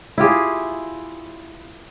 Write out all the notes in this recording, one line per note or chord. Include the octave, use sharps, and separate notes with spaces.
E4 F4 G4 G#4